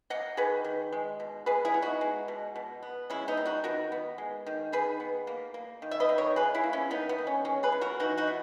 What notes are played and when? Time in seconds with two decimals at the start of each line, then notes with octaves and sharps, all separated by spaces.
0.10 A#3 D#5 F#5
0.37 D#3 G#4 B4
0.64 D#3
0.93 G#3
1.20 B2
1.46 B2 G#4 B4
1.65 E4 G#4
1.74 B3
1.82 D#4 F#4
2.01 G#3
2.28 B2
2.56 B2
2.83 B3
3.10 G#3 C#4 E4
3.28 B3 D#4
3.37 D#3
3.46 D#4 F#4
3.64 D#3 F#4 A#4
3.92 B3
4.18 G#3
4.47 D#3
4.72 D#3 G#4 B4
5.00 B3
5.27 A#3
5.54 A#3
5.82 D#3
5.91 E5
6.00 B4 D#5
6.09 D#3
6.18 A#4 C#5
6.36 A#3 G#4 B4
6.55 E4 G#4
6.64 A#3
6.73 C#4 E4
6.90 D#3 B3 D#4
7.09 B3
7.18 D#3
7.27 C#4
7.45 G#3 C#4
7.63 G#4 B4
7.72 E3
7.81 F#4 A#4
8.00 E3 D#4 F#4
8.18 D#4 F#4
8.27 B3